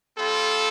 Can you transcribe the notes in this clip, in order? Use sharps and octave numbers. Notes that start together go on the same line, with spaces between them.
G3 C4 F4 A4